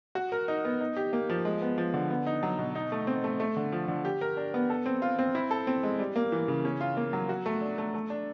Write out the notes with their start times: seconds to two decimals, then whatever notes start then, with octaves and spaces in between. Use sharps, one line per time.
0.15 F#4
0.32 A#4
0.48 D#4
0.65 B3
0.81 D#4
0.96 G4
1.13 A#3
1.29 F3
1.45 G#3
1.62 B3
1.78 F3
1.94 D3
2.10 B3
2.27 D#4
2.43 F#3
2.58 B2
2.75 D#4
2.92 A3
3.07 C4
3.24 A3
3.40 A3
3.57 D3
3.72 F3
3.88 D3
4.05 G4
4.21 A#4
4.37 D4
4.54 B3
4.70 A4
4.86 C4
5.02 F4
5.19 C4
5.35 E4
5.51 A4
5.67 C4
5.83 G#3
5.99 G3
6.16 A#3
6.32 E3
6.48 C#3
6.65 C#4
6.81 F4
6.97 A#3
7.13 F#3
7.29 F#4
7.46 A3
7.61 D4
7.78 A3
7.94 A3
8.10 D4